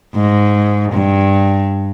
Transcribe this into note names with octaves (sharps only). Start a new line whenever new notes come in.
G#2
G2